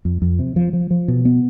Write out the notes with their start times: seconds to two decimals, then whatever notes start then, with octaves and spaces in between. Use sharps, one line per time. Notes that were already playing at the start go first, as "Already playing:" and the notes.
0.05 F2
0.22 F2
0.39 C3
0.56 F3
0.73 F3
0.91 F3
1.08 B2
1.25 B3